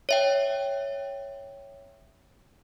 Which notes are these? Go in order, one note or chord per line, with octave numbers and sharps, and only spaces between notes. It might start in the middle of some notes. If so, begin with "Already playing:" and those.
C#5 E5 G5